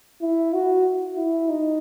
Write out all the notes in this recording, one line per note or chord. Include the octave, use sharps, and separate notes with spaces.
E4
F#4
E4
D#4